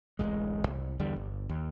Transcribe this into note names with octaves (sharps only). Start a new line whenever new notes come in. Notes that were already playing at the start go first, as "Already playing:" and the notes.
D1 A1 F#2 G#3
C2
E2 D3 G3
G1
D#2